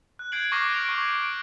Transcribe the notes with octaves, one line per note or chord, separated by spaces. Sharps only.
F#6
G6 G#6 C7 D7 F#7
C#6 D6 F6 G6 A#6 C7
F6 G6 D7 F7
C#6 G#6
D7